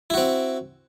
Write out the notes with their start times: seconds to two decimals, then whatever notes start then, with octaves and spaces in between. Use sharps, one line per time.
0.10 E4
0.14 F#4
0.17 C4